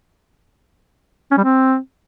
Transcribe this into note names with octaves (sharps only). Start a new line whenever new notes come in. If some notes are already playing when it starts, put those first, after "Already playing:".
C#4
G3
C4